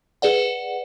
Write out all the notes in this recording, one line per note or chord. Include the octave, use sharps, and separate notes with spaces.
G#4 B4 D5 F#5